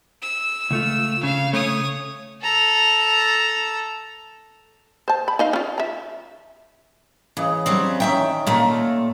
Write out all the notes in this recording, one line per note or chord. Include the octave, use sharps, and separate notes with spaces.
E6
C#2 A3 F4
C#3 F5
C#3 A3 C#5 D#6
A4 A#5
C5 A5
B5
D#4 D#5 F5
C#4 F4
E5 A#5
C#3 E3 D#5
F#3 G3 C4
D#3 E3 C#4 E5 G5
A#2 A3 F4 A4 A#4